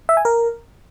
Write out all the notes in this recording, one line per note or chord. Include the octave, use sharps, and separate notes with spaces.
E5
G#5
A#4